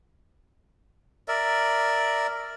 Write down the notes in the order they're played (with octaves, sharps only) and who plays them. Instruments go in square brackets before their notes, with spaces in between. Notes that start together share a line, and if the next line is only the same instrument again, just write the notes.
[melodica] A#4 D5 E5